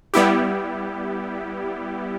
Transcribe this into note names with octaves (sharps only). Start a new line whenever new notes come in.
G3 B3 E4 G4